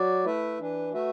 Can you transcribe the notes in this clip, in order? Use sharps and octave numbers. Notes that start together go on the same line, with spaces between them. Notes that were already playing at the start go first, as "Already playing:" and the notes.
Already playing: F#3 F#4 D5
A3 E4 B4 E5
E3 D4 B4
A3 F#4 B4 E5